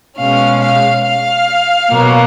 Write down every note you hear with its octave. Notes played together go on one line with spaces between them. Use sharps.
B2 G#3 C#4 F5
F5
F5
B2 F#3 A#3